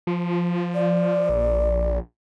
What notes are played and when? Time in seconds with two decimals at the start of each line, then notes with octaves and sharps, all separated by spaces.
0.07 F3
0.75 D5
1.29 A#1